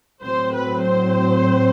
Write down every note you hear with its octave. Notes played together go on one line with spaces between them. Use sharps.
A2 F#3 C4 C5
B4
C5